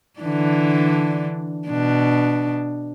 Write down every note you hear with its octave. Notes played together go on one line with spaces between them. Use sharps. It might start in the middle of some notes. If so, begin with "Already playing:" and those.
D3 E3 D4
B2 D4